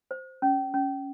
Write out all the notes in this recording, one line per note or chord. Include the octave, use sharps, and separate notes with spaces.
C5
C#4
C#4